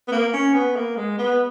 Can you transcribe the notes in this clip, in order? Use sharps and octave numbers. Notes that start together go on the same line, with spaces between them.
B3
A#3
C#4
B3
A#3
G#3
B3